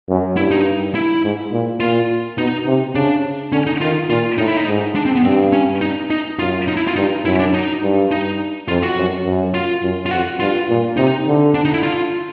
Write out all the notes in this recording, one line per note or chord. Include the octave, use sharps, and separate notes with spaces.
F#2
G2 E4
D#4
E4
G#2
A#2
A#2 F4
B2 D#4
C3
C#3 D4
D3 C#4
D#4
D#3 F4
A#2 F4
A2 D#4
E4
D#4
G#2
D4
C4
B3
G2 C4
C#4
D#4
D#4
F#2 F4
D#4
E4
F4
G2 D#4
F#2 E4
D4
D#4
G2
D#4
F2 F4
F#4
F#2
F#2
F4
F#2
F4
F2 F#4
G2 F4
A#2
C3 D#4
D3
D4
D#4
E4
F4